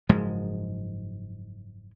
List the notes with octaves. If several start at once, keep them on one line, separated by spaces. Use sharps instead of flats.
F#1 G#2 F3 G#3